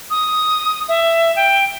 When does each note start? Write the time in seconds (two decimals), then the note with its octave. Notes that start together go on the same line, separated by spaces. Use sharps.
0.10 D#6
0.89 E5
1.36 G5